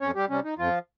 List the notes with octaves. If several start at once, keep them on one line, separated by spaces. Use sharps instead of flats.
F2 C#4 C#5
G3 G4
C3 G3 C#4
D#4
F2 F3 F4